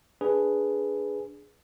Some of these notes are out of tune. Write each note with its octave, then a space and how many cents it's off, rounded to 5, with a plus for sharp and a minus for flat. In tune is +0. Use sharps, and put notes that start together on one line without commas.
D4 +0 G#4 +0 B4 +0